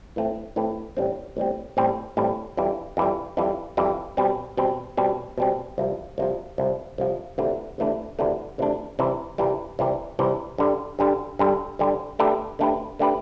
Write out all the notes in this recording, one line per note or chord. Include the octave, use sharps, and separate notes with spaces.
A2 E3 A3 C4
A2 E3 A3 C4
A1 A2 G3 C4
A1 A2 G3 C4
A1 A2 G3 C4
A1 A2 G3 C4
F2 E3 G3
F2 E3 G3
F2 E3 G3
F2 E3 G3
B2 G3 C4
B2 G3 C4
B2 G3 C4
B2 G3 C4
C2 C3 F3
C2 C3 F3
C2 C3 F3
C2 C3 F3
D2 C3 E3 A3 D4
D2 C3 E3 A3 D4
D2 C3 E3 A3 D4
D2 C3 E3 A3 D4
C2 C3 E3 G3
C2 C3 E3 G3
C2 C3 E3 G3
C2 C3 E3 G3
G2 D3 G3
G2 D3 G3
G2 D3 G3
G2 D3 G3
D3 A3 D4 G4 B4
D3 A3 D4 G4 B4
D3 A3 D4 G4 B4